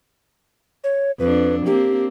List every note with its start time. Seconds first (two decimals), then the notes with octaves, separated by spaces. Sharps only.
0.84 C#5
1.19 F2 D4 B4
1.66 A#3 C4 D4 G4